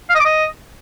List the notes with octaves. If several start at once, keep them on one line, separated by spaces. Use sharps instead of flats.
F5
D#5
D6
D#5